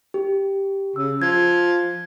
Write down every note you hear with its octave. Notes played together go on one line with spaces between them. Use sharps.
G4
C#3 E6
F3 G#6